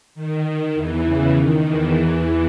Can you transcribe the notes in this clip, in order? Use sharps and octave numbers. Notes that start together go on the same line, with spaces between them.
D#3
D#3
E2 E3
C#3
D#3
E2 E3
E2 E3